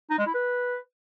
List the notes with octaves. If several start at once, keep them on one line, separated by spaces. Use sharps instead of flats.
D#4
G#3
E4
B4